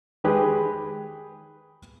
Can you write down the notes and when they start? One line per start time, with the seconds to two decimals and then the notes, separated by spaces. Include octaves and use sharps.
0.24 D#3 G#3 G4 G#4 B4